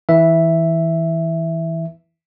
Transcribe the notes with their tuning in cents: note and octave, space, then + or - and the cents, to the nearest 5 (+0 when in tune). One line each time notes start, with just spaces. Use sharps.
E3 -20 E5 +0